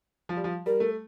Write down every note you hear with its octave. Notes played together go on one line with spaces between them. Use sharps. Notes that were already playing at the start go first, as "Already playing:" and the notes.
F3
G3
F3
G3 A#4
A3